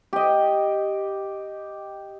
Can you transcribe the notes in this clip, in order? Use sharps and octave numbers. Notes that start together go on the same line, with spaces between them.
G4 D#5